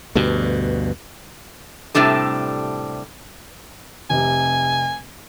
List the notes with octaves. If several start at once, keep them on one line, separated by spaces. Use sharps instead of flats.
D2 G2 B2
A2 C3 G3 D4 A4
F1 C3 G#5